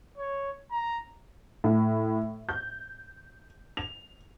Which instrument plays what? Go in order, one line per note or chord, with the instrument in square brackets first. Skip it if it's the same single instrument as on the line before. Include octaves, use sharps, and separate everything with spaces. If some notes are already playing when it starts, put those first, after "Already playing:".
[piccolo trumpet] C#5
A#5
[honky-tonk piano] A2
G6
F7